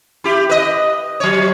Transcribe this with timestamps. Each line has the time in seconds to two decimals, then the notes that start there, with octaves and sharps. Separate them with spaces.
0.24 E4 G4
0.49 B4 D#5
1.20 F#3 C#5